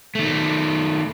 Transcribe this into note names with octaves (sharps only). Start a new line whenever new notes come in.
D#3 A3